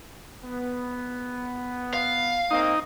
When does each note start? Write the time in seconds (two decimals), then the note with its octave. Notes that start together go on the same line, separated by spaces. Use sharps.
0.44 B3
1.94 F5
2.51 A#3 C4 D#4 D#5